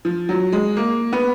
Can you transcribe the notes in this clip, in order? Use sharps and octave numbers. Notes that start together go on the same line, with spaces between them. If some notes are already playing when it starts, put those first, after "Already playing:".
F3
F#3
G#3
A#3
B3